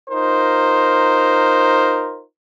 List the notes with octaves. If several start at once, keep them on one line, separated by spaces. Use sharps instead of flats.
D#4 F4 A#4 C5